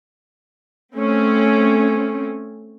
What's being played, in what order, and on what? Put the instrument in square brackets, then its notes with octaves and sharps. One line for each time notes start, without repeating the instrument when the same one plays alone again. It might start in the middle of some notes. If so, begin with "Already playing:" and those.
[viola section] A3 C4 C#4